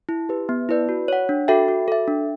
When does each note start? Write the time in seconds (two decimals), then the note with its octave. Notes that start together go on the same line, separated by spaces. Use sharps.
0.09 E4
0.29 G4 B4
0.49 B3
0.69 E4 B4 D5
0.89 F#4
1.08 C#5 F#5
1.29 D4
1.48 F#4 A4 E5 G5
1.68 F#4
1.88 A4 E5
2.08 D4